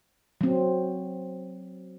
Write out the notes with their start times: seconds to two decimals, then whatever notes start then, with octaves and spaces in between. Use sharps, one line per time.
0.41 F#3 C4